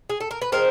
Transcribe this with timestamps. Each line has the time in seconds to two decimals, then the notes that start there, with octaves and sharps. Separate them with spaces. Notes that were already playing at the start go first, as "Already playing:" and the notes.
0.10 G#4
0.20 A4
0.31 A#4
0.42 B4
0.52 D#3 G#3 C4 A#4 C5